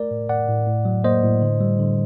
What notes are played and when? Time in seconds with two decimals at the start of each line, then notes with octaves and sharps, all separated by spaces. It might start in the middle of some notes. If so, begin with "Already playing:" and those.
Already playing: A3 A#4 D5
0.11 A2
0.29 A2 D5 F#5
0.48 A2
0.66 A2
0.85 F#3
1.04 A#3 C5 D#5
1.23 A2
1.41 D3
1.60 G3
1.79 D3